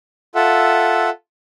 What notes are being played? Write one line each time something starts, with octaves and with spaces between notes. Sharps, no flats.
F4 A4 E5 F#5